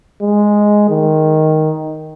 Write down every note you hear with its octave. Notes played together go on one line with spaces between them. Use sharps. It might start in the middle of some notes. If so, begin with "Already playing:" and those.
G#3
D#3